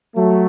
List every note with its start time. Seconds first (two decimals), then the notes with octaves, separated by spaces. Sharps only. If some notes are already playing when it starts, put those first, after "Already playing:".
0.16 F#3 A3